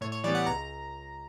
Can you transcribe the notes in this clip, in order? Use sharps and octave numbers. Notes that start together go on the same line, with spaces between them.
A2 C#5
C#5
E3 G3 B3 D5
F#5
C#2 A#5